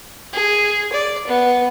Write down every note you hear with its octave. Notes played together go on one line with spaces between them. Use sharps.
G#4
D5
B3